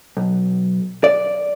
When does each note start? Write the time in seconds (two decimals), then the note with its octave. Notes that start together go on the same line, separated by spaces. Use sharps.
0.17 B1
1.04 D5